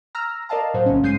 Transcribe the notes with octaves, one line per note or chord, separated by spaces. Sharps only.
A#5 E6 F6 A#6
A#4 D5 D#5 F5 A5 A#5
A2 F#3 C5
A#1 C#3 C#4
G#2 G#3 G6 C7 D#7